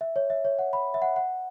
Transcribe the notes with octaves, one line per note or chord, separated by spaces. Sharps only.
E5
C#5
E5
C#5
F#5
B5
E5
F#5
F#5